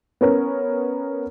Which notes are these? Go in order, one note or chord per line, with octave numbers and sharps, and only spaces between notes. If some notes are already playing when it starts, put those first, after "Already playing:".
B3 C#4 A#4